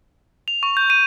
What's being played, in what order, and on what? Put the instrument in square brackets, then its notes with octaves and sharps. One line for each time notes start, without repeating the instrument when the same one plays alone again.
[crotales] F7
C#6
G6
D#7